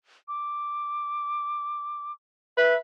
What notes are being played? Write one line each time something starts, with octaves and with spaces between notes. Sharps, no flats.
D6
B4 E5